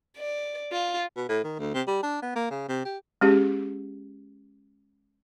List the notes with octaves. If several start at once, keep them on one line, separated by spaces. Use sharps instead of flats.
D5
F4
B2
A2
D#3
D2
C3
G3
D4
B3
A#3
C#3
C3
G4
G#3 C#4 G4 G#4